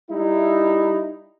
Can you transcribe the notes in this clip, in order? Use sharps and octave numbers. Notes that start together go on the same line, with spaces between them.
G3 D#4 E4